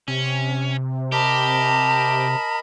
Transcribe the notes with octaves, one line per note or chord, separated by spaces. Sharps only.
C3 C#4
G4 A#4 D#5 A5 B5